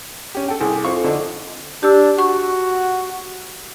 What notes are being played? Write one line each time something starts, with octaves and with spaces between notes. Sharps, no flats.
C#4 G4
A4 G5
C2 G#4
F2 F5 C#6
D3 D4 D#4
D4 G4 E6
F#4 C#6